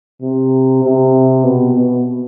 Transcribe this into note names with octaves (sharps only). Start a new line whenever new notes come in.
C3
C3
B2
B2